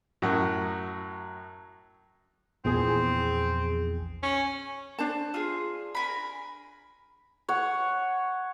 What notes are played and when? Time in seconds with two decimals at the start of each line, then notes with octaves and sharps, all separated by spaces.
0.22 F#2 A2 F#3 F#5
2.65 A#1 E2 C4 G#4
4.23 C#4
4.98 D4 C5 A5
5.34 F4 G#4
5.95 A#4 G#5 B5
7.49 C#5 F#5